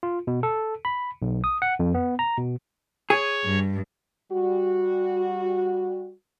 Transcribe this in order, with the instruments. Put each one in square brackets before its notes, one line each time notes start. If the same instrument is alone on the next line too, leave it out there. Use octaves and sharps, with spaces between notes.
[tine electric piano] F4
B2
A4
B5
B1
D#6
F#5
F2
B3
A#5
B2
[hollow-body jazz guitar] G#4 [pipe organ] C#5
[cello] G2
[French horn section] G3 F#4